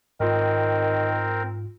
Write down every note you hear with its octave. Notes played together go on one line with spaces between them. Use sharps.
G#2 D#3 C4 F4 A#4